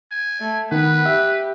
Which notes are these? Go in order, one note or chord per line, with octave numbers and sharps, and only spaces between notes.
G#5
A3
D#3 B3 B4
G4 E5